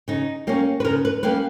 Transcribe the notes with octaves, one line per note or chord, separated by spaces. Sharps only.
C#3 D#4
G3 A#3 C#4
B4
C#3 A#4
B4
G3 A#3 C#4 B4